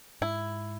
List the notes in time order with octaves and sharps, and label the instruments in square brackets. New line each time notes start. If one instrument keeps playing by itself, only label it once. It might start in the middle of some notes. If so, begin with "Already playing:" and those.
[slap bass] G#2 [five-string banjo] E4